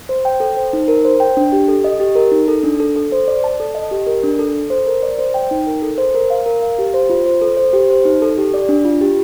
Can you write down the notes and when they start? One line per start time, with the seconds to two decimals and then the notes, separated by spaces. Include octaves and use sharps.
0.09 C5
0.25 G5
0.40 A4
0.57 C5
0.73 D#4
0.88 A#4
1.05 C5
1.20 G5
1.37 D4
1.52 G4
1.68 A4
1.84 D#5
2.00 G4
2.15 A#4
2.32 D#4
2.48 A4
2.63 D4
2.80 A4
2.96 A4
3.12 C5
3.28 D5
3.44 A5
3.60 A4
3.75 D#5
3.91 G4
4.07 A#4
4.24 D4
4.39 A4
4.55 A4
4.70 C5
4.87 A#4
5.03 D5
5.19 C5
5.34 G5
5.51 D#4
5.67 A#4
5.82 A4
5.98 C5
6.14 A#4
6.30 F5
6.46 A#4
6.62 F5
6.79 G4
6.94 C5
7.10 F4
7.26 C5
7.41 A4
7.57 C5
7.73 G4
7.90 C5
8.05 D#4
8.22 A4
8.38 G4
8.54 D5
8.69 D4
8.85 F4
9.01 G4